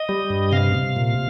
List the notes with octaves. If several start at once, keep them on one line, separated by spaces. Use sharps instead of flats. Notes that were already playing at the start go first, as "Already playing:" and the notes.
Already playing: D#5
G3
G2
C3 F5
C3
A#2